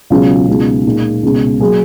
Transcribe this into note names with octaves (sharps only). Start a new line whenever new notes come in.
C#2 B2 F#3 C#4 F4
C#2 B2 G#3 D#4
A#2 G#3 D#4
C#2 B2 G#3 C#4
F#3 A#3 G#4